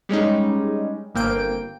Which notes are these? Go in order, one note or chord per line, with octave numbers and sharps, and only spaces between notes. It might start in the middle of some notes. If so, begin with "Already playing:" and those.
G3 G#3 C#4 D#4
G1 A#3 C4 G5 D7